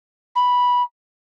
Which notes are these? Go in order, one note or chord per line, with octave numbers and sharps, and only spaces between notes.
B5